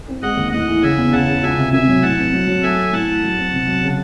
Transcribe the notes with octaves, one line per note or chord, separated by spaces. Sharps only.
C4
G#3 D#5 F#5
D#2
A2 D#5 F#5
E3
C#3 E5 G#5
E2
C#3 F#5 A5
C#3
C#2 E5 G#5
C3
G#1 E5 G#5
F#3
A2 F#5 A5
C4
F#3
F#3
A3 E5 G#5
A3
A2 F#5 A5
E3
F#3
C4
C3
F#3
C#3